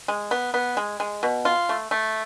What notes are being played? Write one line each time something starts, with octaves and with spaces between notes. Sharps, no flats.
G#3
B3
B3
G#3
G#3
B2
F4
A3
A3